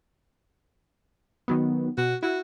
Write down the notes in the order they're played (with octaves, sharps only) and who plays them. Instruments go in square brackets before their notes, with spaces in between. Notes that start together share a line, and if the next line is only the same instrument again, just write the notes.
[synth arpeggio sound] D#3 F#3 B3
[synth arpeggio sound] B2 [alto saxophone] F#4
[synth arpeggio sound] E4 [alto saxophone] F#4